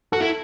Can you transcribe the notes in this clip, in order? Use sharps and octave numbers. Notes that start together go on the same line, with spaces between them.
F#4 A4
E4